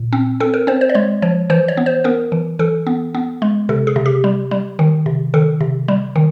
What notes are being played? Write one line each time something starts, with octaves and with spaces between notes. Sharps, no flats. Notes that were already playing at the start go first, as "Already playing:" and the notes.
Already playing: A#2
C4
C4 A4
A#4
C4 C5
C5
D5
G#3 C#5
F3 C#5
E3 C5
C#5
B3
C5
B3 A#4
E3
E3 A4
B3
B3
G#3
C3 A4
G#4
C3
G4
G3
G3
D#3
C3
D#3 A4
C3
G3
D#3